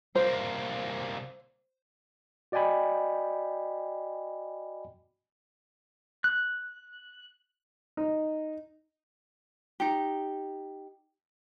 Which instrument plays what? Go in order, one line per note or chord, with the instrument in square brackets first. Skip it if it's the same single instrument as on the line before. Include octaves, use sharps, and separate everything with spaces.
[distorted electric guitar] C2 A#3 [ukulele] C5
[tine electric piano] F#4 D5 D#5 G5 G#5 B5
[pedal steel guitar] F#6
[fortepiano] D#4
[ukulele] D#4 G4